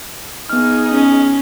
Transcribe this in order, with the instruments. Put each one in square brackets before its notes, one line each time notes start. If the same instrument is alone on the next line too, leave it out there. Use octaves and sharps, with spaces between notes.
[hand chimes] B3 F6 [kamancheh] D#4 G#4
[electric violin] C#4